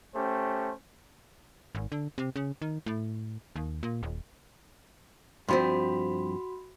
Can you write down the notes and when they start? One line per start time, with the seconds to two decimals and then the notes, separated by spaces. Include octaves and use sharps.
0.15 A3 C#4 G4 C5
1.75 G#1
1.92 D3
2.18 C3
2.36 C#3
2.62 D#3
2.86 A2
3.56 D#2
3.83 A#2
4.03 D#1
5.48 G2 F3 C4 F#4 B5 C6